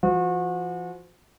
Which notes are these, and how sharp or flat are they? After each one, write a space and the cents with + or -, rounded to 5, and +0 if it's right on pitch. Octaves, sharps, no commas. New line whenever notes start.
F3 -35 F#4 -35